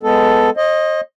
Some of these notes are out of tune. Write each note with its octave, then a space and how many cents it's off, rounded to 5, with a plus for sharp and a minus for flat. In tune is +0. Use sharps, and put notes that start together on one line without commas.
G#3 +0 B3 +15 A4 +0
C5 +40 D#5 +0